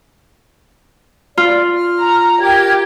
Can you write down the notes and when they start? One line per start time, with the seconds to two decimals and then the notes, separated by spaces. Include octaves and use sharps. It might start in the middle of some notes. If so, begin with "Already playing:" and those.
1.38 F4 D5
1.73 F6
2.02 A#5
2.40 G4 A#4 G#6